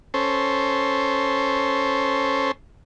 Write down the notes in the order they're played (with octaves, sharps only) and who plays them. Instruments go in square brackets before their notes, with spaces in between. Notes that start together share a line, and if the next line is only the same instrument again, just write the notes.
[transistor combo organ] C#4 A4 C5